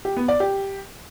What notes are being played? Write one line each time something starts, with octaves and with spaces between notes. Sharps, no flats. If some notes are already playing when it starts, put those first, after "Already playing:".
G4
B3
D5
G4